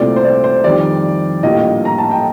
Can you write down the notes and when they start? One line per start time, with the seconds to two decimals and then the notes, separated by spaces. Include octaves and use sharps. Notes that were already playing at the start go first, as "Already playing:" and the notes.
Already playing: C2 A#2 A3 C4 D5
0.16 C5
0.24 D5
0.44 C5
0.64 F2 D#3 G3 D5
1.43 A#1 A2 G3 A#3 D#5
1.85 A#5
1.98 A5
2.11 G5